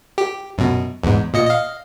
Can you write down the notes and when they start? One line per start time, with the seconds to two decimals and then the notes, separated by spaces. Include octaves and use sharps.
0.18 G4
0.58 F#2 B2
1.04 E2 G#2
1.34 A#2 D#5 C#7
1.46 D#5 F5